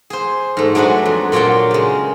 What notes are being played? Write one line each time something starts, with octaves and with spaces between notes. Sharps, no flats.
G#4 C5
G#2 A3
F#3 G#3 D4 G#4 B4
F2
A#2 F#3 F4 C#5 G5
C#3 G#3